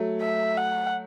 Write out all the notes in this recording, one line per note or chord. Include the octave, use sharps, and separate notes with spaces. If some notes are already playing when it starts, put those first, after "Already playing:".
Already playing: F#3 A3
E5
F#5